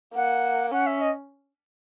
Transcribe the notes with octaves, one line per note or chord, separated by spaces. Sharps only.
A#3 F#5
C#4 F#5
E5
D#5